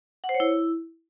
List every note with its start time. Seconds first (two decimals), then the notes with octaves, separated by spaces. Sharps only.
0.24 F#5
0.29 C5
0.35 C#5
0.40 E4